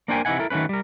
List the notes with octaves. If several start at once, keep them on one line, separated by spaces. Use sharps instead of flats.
A#3 D4 A#4 C5 G5 G#5
C3 E3 D#4 E4 F#5 G#5
E4 A4 A#4
D#3 F#3 A3 C#4 B4
G3 A#4